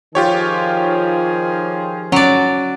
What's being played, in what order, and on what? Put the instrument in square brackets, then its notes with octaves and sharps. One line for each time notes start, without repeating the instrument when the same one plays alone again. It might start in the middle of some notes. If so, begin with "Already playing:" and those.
[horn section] D#3 F3 G#4 [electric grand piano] F4 G4 C#5
[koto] F#3 D5 [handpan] C#4